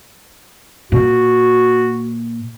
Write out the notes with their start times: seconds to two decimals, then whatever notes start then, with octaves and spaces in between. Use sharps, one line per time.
0.92 A#2 F#4